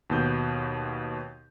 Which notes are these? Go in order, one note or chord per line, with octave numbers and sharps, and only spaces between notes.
D#2 B2 G6